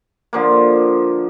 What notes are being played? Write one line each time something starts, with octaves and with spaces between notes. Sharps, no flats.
D3 F3 A#3